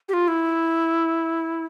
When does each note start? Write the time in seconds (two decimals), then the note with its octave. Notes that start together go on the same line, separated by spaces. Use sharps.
0.09 G4
0.13 F4
0.28 E4